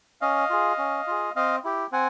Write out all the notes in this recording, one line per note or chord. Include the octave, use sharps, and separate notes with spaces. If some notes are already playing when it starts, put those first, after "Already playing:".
C#4 D#5 F5
F4 G#4
C#4
F4 G#4
C4 D#5 F5
E4 G4
C4 F#5 G#5